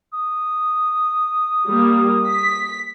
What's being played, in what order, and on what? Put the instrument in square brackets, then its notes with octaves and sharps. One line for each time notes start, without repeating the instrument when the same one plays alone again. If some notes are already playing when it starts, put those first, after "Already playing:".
[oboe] D#6
[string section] G3 A#3
B6